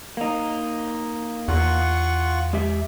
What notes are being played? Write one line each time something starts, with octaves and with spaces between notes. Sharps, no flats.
A#3 D#4
E2 F4 F#5 C#6
G#3 G4 E5